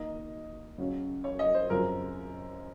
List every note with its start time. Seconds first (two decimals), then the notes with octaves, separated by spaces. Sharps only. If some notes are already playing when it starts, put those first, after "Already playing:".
Already playing: D#3 A#3 D#4 D#5
0.78 C#3 F#3 C#4
1.24 C#5
1.39 D#5
1.54 C5
1.69 F#2 C#3 F3 C4 A#4